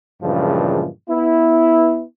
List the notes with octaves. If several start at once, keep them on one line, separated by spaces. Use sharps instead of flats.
G2 A#2 C#3 E3 F3 G#3
B3 E4